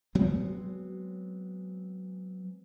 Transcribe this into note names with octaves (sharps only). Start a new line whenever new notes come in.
F#3 G#3 B3 C4